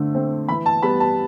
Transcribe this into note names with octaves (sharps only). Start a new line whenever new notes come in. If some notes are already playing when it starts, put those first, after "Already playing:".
Already playing: D3 A3 C4
A3 C4
E3 B5
A5
G3 B3 B5
A5